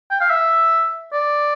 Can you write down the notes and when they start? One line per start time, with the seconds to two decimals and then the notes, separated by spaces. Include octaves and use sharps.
0.11 G5
0.21 F5
0.30 E5
1.13 D5